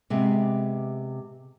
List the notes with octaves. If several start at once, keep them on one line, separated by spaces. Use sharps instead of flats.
C3 G#3 B3